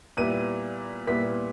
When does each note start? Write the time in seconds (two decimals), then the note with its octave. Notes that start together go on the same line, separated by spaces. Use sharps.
0.17 A#2 G3 B3 E4 D#7
1.07 A#2 G3 B3 E4 B6